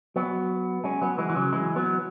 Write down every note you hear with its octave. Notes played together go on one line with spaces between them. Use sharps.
F#3 B3
G#3 C#4
F#3 B3
E3 G#3
E3
C#3 F#3
E3 G#3
F#3 B3